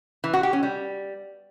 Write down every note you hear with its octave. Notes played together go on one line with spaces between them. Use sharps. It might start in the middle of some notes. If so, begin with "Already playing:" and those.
E3
F#4
G4
C#4
G3